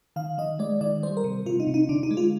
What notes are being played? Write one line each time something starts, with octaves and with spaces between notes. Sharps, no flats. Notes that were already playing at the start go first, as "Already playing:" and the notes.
D#3 F5
D#3 D#5
G#3 D5
D#3 D5
G3 C5
A#4
C3
C3 F4
D#4
C3
D#4
D3 D4
D#4
G#3
F4